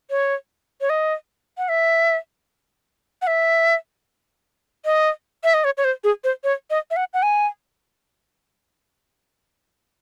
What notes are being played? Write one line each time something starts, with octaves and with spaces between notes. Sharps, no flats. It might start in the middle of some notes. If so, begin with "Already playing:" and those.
C#5
C#5
D#5
F#5
E5
F#5
E5
D#5
E5
D#5
C#5
C#5
C5
G#4
C5
C#5
D#5
E5
F#5
F#5
G#5